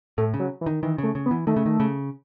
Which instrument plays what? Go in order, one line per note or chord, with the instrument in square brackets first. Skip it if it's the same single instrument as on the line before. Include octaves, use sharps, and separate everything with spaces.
[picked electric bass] A2 [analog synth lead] A3
[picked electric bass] C#3
[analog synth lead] F#3
E3
[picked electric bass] D#3
[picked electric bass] D#3 [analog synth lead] E3
[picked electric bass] C#3 [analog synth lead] A3
[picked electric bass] C#3
[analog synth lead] B3
[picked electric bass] E3
[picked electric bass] D#3 [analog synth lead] A3
[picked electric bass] C#3
D#3
C#3